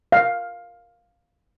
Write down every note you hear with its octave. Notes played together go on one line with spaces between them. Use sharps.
F5